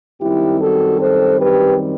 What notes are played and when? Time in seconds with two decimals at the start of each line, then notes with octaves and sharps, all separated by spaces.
0.21 F#2 D#3 G3 C4 E4 G4
0.61 F#4 A4
1.00 A4 C5
1.40 G4 B4